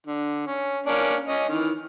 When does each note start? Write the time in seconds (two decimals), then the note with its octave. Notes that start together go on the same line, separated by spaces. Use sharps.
0.07 D3
0.46 C#4
0.86 A#3 C#4 D4
1.28 C#4 D#5
1.49 D#3 E3